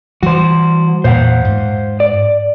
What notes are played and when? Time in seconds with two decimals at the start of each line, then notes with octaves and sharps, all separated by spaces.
0.23 E3 G3 F#4 C5
1.04 E2 A#2 C5 F5 F#5
1.45 G#2
2.00 D5